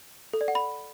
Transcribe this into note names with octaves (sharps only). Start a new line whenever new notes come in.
A4
D5
F#5
B5